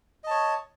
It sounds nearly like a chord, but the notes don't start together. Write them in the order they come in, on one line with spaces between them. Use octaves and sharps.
D#5 A5 C#5